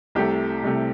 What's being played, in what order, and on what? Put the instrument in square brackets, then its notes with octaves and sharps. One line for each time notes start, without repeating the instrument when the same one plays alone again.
[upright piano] C2 C3 A3 G4
C2 C3 A3